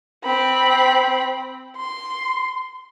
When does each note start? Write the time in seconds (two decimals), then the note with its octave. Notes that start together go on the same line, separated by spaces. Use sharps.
0.24 C4 B5
1.76 C6